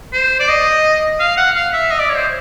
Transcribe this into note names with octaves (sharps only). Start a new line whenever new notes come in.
C5
D5
D#5
F5
F#5
F5
E5
D#5
D5
C#5
C5